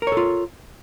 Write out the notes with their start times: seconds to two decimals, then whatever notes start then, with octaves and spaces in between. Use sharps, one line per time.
0.02 A#4
0.07 C#5
0.12 A4
0.17 F4